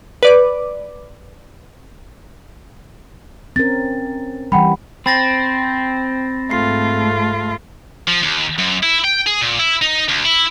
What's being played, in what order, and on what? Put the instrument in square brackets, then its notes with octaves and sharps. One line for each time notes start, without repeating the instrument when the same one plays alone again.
[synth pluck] B4 D5 D6
[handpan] C4 C#4 A#4 [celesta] A6
[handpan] E3 G3 [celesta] F#5 G5 B5
[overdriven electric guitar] C4 [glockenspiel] B5 A6 A#6
[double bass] G#2 A3 [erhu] F4 [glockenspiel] C7
[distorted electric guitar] F3
D#2
F#2
E4
G5
G#4
A#2
E4
D#4
D2
E4